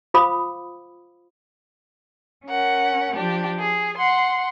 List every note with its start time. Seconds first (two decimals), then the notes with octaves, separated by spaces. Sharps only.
0.14 F4 C5 F5 B5 D6 D#6
2.46 C#4 A#4 F#5
3.15 F3 D4 G4
3.59 G#4
3.97 F#5 C6